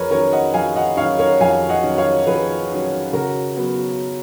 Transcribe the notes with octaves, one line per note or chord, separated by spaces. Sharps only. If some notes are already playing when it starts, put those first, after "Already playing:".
Already playing: F2 G#4 A#4 B4 C#5
D#3 F#3 C#4 A#4 C#5
D#5 F#5
F2 F5 G#5
D#5 F#5
D#3 F#3 C#4 C#5 F5
A#4 C#5
F2 F5 G#5
D#5 F#5
D#3 F#3 C#4
C#5 F5
F2 G#4 B4
D#3 F#3 C#4
C#3 F#4 A#4
F#3 B3